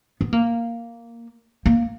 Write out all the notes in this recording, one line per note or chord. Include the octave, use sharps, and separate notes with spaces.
B3
A#3
A#3